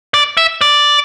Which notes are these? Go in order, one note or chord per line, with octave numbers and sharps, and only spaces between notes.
D5
E5
D5